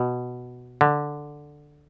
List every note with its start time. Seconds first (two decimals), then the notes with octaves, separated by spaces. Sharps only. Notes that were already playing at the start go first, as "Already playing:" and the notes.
Already playing: B2
0.81 D3